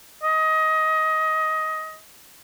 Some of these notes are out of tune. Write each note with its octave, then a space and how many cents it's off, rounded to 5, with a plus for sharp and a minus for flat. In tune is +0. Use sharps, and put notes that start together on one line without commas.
D#5 +20